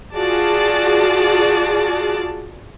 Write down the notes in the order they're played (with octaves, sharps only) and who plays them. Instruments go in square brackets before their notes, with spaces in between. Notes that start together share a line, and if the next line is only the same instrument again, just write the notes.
[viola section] F4 F#4 G#4 D5 A5